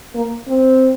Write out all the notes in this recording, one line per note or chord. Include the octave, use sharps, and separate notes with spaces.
A#3
C4